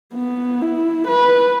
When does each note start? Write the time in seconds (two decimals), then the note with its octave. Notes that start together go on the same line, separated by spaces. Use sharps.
0.14 B3
0.61 E4
1.07 B4